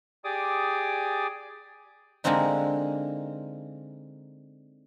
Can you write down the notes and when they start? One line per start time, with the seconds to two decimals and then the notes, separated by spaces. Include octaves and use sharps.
0.24 G4 G#4 D5 D6 D#6
2.24 D3 G#3 A#3 C4 D#4